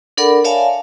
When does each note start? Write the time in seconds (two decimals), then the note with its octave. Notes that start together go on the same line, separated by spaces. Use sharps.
0.17 D4 A4 A#4 D5 F#5 B5
0.44 C#5 D5 E5 F5 G#5 A5